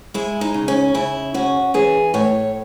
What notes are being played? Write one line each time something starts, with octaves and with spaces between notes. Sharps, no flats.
G#3 E4
D#4
C#3
C#4
C#3 E4
C#4 F#4
E3 G#4
A2 C#5